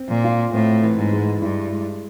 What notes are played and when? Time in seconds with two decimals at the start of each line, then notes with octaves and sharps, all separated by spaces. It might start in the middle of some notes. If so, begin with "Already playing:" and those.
Already playing: C4
0.09 A#2
0.24 F4
0.54 A2 C4
0.83 E3
0.98 G#2
1.13 G#3
1.42 G2 E4
1.72 G#3